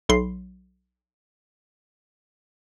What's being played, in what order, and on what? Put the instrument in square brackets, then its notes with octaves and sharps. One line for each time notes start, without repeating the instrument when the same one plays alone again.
[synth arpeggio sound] B1 B5 C6 C7